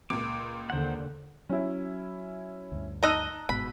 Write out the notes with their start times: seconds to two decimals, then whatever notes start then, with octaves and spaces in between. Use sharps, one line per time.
0.10 C#2 A#2 D6
0.70 D#2 D3 C5 F#5
1.49 F#3 C#4 E4
2.72 D2 G2
3.03 D#4 D#5 A5 A#5 E6 F#6
3.49 G1 G#2 B2 B5